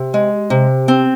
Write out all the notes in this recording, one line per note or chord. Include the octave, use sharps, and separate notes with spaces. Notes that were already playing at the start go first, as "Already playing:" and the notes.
Already playing: C3
G#3
C3
C4